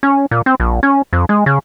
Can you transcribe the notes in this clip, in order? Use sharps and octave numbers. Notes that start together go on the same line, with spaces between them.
C#4
A#2
C4
A#1
C#4
F2
G#3
C#3